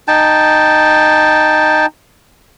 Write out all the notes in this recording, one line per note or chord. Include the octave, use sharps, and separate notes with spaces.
D#4 G5 A5